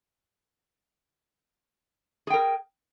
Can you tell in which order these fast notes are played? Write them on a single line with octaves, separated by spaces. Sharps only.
G#4 G5 A#4